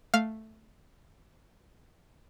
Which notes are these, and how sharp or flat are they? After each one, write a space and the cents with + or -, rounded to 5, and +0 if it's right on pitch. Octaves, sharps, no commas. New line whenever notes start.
A3 +0 F5 +0